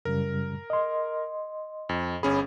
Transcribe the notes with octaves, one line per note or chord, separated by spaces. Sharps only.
F#2 C#3 G3 A#4
D#5 C6
F2
G1 C#4 G#4 B5